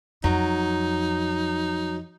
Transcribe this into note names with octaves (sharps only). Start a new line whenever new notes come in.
F2 F#3 D#4